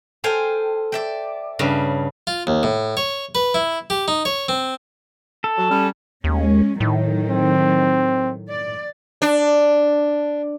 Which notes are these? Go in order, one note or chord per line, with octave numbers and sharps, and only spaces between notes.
A4 C5 F5 G5 G#5
D5 E5 G5
G2 C#3
F4
D#2
A2
C#5
B4
E4
G4
D#4
C#5
C4
A4
F#3 F#4
G3 C#4
D#2 G#3 C#4
A2 D#3 F#3
C4
D5
D4